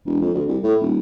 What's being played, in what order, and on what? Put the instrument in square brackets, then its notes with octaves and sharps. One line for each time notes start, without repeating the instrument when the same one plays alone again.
[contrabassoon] E1
F2
D2
C2
A2
D#1